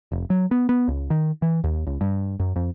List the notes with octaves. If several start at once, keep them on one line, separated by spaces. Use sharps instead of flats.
F1
F#3
B3
B3
C#2
D#3
E3
D#2
C#2
G2
F#2
F2